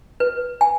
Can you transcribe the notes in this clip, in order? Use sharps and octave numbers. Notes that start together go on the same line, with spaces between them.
B4
G#5